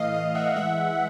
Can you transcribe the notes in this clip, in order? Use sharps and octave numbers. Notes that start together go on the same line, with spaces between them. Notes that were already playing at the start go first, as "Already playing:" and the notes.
Already playing: A2 E3 A3 D#5 F5
E3 D#5 F5
E3 E5 F#5
G#3 E5 F#5
G#3